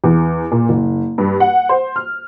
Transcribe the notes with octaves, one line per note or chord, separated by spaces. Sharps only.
E2
A#2
F#1
G2
F#5
C5
F6